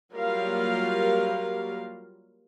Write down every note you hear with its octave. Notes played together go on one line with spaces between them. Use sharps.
F#3 G3 A#3 F4 A#4 F5